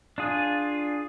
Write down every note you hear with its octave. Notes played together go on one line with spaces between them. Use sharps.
D4 F4 G#4